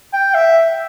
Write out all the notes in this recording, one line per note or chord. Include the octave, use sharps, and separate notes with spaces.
G5
E5